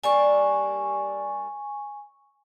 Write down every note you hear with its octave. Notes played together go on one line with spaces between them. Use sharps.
G3 A#3 D4 G#5 C#6